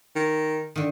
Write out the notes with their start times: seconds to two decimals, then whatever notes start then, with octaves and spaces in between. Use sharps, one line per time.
0.16 D#3
0.76 D3 D#3